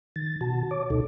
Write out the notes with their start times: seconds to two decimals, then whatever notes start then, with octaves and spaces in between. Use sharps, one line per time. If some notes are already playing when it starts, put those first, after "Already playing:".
0.16 D#3 A6
0.41 B2 F#4 A5
0.71 C#5 D6
0.90 D2 B2 D#4 A4